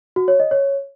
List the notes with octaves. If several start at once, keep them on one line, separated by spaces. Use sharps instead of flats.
F#4
C#5
D#5
C#5